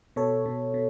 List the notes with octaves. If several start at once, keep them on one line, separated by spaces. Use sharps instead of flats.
B2 A4 C#5
B2
B2